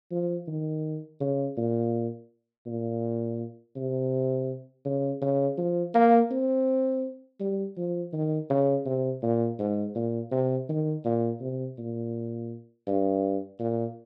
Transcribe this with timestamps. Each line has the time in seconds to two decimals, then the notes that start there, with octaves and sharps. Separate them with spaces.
0.11 F3
0.48 D#3
1.21 C#3
1.57 A#2
2.66 A#2
3.76 C3
4.85 C#3
5.22 C#3
5.58 F3
5.94 A#3
6.31 C4
7.40 G3
7.77 F3
8.13 D#3
8.50 C#3
8.86 C3
9.23 A#2
9.59 G#2
9.95 A#2
10.32 C3
10.69 D#3
11.05 A#2
11.41 C3
11.78 A#2
12.87 G2
13.59 A#2